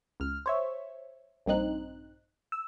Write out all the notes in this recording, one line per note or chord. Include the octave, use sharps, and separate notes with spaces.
C#2 F6
C5 C#5 E5
A#1 G2 C4 D#4 F#6
E6